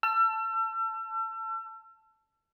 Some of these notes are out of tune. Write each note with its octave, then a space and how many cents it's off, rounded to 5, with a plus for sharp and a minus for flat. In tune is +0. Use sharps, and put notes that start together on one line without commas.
A5 +0 E6 +40